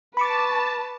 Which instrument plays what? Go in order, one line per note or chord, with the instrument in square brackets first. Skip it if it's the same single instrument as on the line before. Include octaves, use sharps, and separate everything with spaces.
[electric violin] B4 [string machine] A5 [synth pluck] B5 C#6 D6